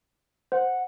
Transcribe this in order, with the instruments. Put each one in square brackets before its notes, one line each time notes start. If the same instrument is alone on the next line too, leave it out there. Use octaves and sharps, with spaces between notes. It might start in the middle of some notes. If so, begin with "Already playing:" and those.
[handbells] C5 [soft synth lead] F#5